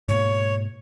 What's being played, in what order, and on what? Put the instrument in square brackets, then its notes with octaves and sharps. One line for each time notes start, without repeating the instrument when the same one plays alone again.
[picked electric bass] G#2 B2 A#3 [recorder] C#5